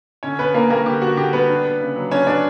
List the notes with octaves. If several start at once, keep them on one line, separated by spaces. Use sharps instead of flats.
D3 C#4 C#5
B3 B4
D3 A#3 A#4
G3 A#3 A#4
D3 G4
B3 F#4
D3 G4
G3 B3 B4
D4
B3
C#3
F#3
C#4 D4 C#5
B3 D4 D5